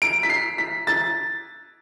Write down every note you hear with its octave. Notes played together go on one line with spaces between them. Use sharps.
D7
B6
C7
B6
A6